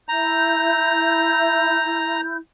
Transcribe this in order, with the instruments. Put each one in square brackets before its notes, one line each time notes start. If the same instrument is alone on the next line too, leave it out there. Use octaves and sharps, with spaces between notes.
[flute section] E4 G6 [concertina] A#5